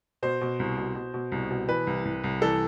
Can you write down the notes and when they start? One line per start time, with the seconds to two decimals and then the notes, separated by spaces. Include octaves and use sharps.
0.23 B2 C5
0.41 B2
0.60 C2
0.77 B2
0.95 B2
1.14 B2
1.32 C2
1.50 B2
1.69 E3 B4
1.87 C2
2.05 C2
2.24 C2
2.42 E3 A4